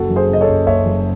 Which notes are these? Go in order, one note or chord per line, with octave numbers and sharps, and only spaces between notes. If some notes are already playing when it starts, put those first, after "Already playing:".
Already playing: F#1 F#4 A4
F#2
G#4 C5
C#3 D#5
A4 C#5
F#1
F#1 C#5 E5
F#2